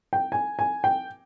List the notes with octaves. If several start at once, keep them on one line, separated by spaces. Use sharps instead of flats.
G5
G#5
G#5
G5